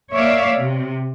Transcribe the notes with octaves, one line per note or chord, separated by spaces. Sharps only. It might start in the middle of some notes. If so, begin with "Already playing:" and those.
A#3 C#5 D5 E5 F5
C3